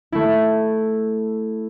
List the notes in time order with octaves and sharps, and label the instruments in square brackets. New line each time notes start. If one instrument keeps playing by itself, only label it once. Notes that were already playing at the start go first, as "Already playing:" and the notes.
[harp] A3 E4